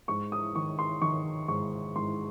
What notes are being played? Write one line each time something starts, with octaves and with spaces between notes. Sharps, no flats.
G#2 C#6
D#6
D#3 C#6
C6
D#3 C#6
G#2 C#6
G#2 C6